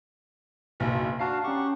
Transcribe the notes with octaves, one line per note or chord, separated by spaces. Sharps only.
F#1 B1
D4 F#4 F5 A5 C7
C#4 G4 F#5 A#5 C#6